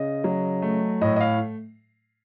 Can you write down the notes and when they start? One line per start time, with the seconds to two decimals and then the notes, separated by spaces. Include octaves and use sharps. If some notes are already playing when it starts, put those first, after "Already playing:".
Already playing: C#3 D#5
0.24 F#3
0.62 A3
1.01 A2 D#5
1.16 D#5
1.20 F5